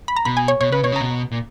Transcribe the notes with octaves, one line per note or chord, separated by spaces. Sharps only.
B5
A#5
B2 B5
G#5
C#5
B2 C#5
C#3 B4
B2 C#5
C#3
B2 A#5
A#2